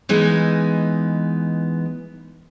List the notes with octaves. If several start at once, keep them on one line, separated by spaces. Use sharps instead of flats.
E3 G#3 B3 D#4